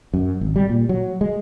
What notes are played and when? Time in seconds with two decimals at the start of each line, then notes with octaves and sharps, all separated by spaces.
0.14 F#2
0.41 G#1
0.56 G3
0.69 A#2
0.89 F#3
1.21 G#3